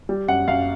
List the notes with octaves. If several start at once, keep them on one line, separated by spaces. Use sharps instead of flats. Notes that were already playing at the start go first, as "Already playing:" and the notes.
G3
F#2 F#5
F#2 F5